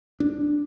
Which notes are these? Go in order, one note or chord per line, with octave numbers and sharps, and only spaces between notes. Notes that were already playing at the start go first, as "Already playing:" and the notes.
D4